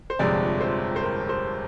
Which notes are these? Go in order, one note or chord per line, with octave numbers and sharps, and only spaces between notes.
C5
G1 F2 C3 F3 G#3 D5
C5
C5
A#4
C5